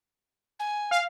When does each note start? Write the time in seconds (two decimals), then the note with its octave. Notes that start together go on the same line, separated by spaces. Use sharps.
0.59 G#5
0.91 F5